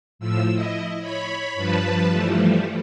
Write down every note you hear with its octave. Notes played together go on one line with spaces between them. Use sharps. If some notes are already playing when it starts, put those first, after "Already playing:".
A2 F3 E6
E4 D#5
C#5 B5
G2 F3 B4 A5
E3 F3 G3 A3